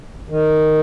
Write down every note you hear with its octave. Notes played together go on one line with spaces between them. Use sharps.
D#3